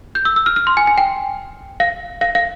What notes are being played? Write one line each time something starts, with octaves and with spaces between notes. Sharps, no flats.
G6
E6
E6
F6
F6
C6
G#5
G#5
G5
F5
F5
F5